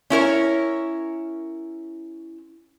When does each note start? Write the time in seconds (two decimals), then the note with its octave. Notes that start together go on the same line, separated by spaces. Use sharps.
0.10 C#4 E4 A#4 C#5